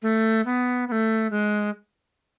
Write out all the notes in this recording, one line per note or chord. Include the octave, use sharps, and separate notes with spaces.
A3
B3
B3
A3
G#3